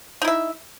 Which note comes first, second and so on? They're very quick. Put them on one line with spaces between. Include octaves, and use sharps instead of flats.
D#4 E4 E5